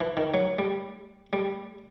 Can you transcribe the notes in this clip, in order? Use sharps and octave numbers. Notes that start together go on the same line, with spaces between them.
E3
D#3
F#3
G3
G3